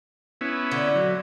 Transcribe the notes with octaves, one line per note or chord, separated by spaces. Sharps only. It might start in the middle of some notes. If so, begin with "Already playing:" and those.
B3 C#4 E4
D3
F#3